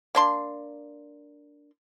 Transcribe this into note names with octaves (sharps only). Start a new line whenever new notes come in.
A#3 D4 C6